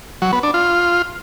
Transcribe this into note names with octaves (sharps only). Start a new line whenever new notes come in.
F#3
B3
D4
F4